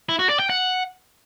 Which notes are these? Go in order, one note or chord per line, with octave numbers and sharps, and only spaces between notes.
E4
F#4
D5
G5
F#5